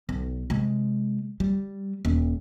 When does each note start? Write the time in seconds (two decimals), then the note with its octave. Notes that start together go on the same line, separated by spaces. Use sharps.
0.09 B1
0.50 C3 G#3
1.40 G3
2.05 D#1